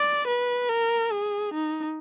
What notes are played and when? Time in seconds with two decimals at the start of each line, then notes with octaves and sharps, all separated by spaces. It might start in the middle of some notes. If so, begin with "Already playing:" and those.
Already playing: D5
0.27 B4
0.69 A#4
1.12 G#4
1.54 D#4